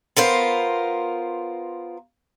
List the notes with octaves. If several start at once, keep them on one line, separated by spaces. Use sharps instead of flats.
B3 F4 A#4 C5